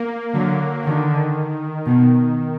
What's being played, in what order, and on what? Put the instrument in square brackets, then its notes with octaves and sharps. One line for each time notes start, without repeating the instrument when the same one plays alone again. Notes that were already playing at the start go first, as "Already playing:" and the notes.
Already playing: [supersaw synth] A#3
[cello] D3 [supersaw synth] F#3
[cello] D3 [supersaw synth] D#3
[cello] B2 [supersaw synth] D#3